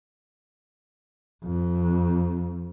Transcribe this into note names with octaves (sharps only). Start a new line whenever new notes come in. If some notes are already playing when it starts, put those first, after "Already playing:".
F2